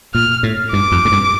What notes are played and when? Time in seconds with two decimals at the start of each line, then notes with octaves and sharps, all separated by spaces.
0.14 A#2 F6
0.43 A2
0.73 G2 D6
0.92 F2
1.05 A2
1.12 G2